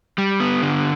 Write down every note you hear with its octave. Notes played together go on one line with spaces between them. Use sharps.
G3
B3
D3